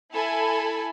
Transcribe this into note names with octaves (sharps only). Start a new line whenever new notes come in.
E4 A4 G#5 A5 B5